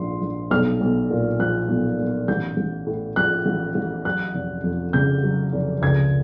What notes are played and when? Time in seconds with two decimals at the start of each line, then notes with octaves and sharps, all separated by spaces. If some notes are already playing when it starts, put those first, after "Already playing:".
Already playing: A#1 G#2 F3 C6
0.22 A#1
0.51 B1 F6
0.81 B1
1.10 A#2
1.39 F3 F#6
1.69 B1
1.99 B1
2.28 A1 G6
2.57 A1
2.87 A2
3.16 F3 F#6
3.46 A1
3.75 A1
4.05 F#3 F#6
4.34 F1
4.64 F2
4.93 C#3 G6
5.23 F#3
5.53 F1
5.82 C#2 G#6